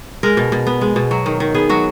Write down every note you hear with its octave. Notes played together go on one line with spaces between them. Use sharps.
G#3 A#4
B2
B2
B3
G#3
B2
F#3
D#3
D#3
B3 G#4
F#3 F#4